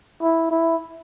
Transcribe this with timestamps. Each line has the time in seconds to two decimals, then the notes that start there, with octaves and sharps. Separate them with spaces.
0.22 E4
0.50 E4